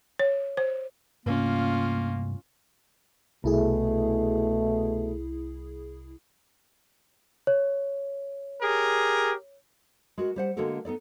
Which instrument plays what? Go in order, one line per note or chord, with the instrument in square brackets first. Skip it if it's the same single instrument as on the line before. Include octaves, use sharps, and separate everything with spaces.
[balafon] C#5
C5
[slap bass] G2 C3 A3 [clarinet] A#3 [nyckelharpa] C#4 F4
[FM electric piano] C2 E4 G#4 [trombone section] B2 A3
[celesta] C#5
[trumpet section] G4 G#4 A#4
[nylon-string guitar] G#3 F#4 A#4
G3 C5 F#5
D3 G#3 A#3 F#4 A4 A#4
B3 D#4 A4 D5